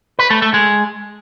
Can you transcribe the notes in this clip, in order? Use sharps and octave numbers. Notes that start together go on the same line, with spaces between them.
B4
A3
A3
G#3